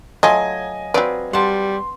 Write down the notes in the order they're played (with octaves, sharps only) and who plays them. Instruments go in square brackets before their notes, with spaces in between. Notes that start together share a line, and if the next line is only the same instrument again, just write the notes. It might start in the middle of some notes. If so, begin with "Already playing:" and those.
[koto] F#3 [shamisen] A3 F4 [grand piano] D#5 G#5
[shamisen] F#3 D5 [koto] C4 F4 B4
[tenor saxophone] G3 [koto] F#5 A5 [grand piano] C6